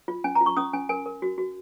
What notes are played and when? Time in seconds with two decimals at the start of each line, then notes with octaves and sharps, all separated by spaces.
0.08 F4
0.24 C#4 G#5
0.35 A#5
0.41 F4
0.46 C#6
0.57 C#4 D#6
0.73 C#4 G#5
0.89 A#4 G#5
1.06 A#4
1.22 F#4
1.38 F#4